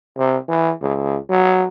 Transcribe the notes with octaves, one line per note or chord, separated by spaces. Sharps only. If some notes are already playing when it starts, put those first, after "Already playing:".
C3
E3
C#2
F#3